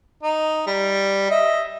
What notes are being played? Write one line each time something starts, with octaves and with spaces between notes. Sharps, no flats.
D#4
G3
D#5 E5